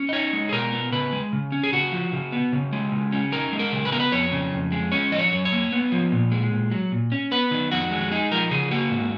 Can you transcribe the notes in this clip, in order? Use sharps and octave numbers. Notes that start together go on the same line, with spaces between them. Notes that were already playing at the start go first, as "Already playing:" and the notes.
Already playing: C#4
D#5
D#4 C#5
G#3
G#4
B2 A#4
B3
C#3 B4
G#3
C#3
C#4
G#4
C#3 F#4
F3
C#3
B3
C#3
G#3
C#3
C#4
D#4 A#4
G#3
A#4
C#3
B4
B3 A#4
B4
F2 C#5
C#3
F2
G#3
C#4 C#5
F3 D#5
C#5
F#2
C#5
A#3
B3
F3
A#2
G#3
A#2
F#3
A#2
C#4
B3 B4
D#3
F2 F#4
G#3
D#4 G#4
F3 A#4
C#3 G#4
A#3 F#4
G#2